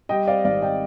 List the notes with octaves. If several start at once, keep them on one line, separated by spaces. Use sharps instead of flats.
G3 D#5 G5
C4 D5 F5
G#1 D5 F5
D#5 G5